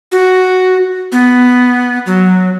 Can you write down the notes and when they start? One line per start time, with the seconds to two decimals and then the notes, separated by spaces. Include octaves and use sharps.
0.12 F#4
1.12 B3
2.06 F#3